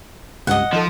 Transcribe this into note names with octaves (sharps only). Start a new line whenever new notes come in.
C#2 G2 D#5 F#5
F3 D#4 A4